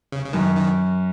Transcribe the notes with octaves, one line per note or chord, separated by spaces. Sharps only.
C#3
C#3
F#2 D#3
D#3